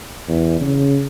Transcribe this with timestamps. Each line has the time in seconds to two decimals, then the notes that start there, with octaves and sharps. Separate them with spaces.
0.28 E2
0.61 C#3